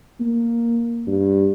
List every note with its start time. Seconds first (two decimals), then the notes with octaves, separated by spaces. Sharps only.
0.20 A#3
1.07 G2